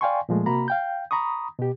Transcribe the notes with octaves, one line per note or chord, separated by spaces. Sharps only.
D5 F5 G5 G#5 C6 C#6
A#2 F3 G#3 A3
C3 A#3 F#4 A#5 B5
F5 G5 G6
A#5 B5 C#6 D#6
B2 G4